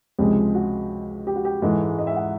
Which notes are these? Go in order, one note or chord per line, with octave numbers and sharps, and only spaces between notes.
C#2 C3 F3 G#3 G4
F#4
G4
F#4
G4
G#2 E3 G#3 A4
D#5
E5
F#5